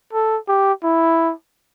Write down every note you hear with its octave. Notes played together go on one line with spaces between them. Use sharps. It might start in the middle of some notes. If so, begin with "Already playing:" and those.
A4
G4
E4